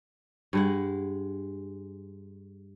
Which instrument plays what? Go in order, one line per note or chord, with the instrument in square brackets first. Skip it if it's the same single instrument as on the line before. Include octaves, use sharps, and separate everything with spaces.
[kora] G2 G#3 F#5